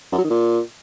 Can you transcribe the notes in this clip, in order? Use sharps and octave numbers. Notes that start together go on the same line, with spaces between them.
F#2
F#3
D#3
A#2